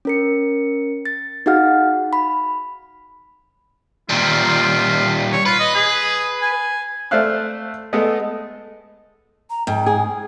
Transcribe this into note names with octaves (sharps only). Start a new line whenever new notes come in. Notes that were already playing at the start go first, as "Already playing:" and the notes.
C#4 A#4 C#7
A6
D#4 F#4 G#4 F5 F#5 F6
B5
A#2 G3 F4
C#5
F4 B4
D#5
G#4
G#5
A3 C5 D5 E5 F5 F#6
G#3 A3 B3 A4 D#5
A#5
G#2 G5
G#4